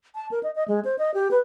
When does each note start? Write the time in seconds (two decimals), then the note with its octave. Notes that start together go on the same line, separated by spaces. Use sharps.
0.15 A5
0.31 A#4
0.43 D#5
0.55 D#5
0.68 G#3
0.85 C5
0.99 D#5
1.14 G4
1.31 B4